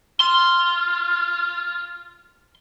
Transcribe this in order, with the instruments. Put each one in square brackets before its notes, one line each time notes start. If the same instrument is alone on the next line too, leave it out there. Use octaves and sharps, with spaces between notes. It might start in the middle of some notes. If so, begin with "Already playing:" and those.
[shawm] F4 [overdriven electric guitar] C6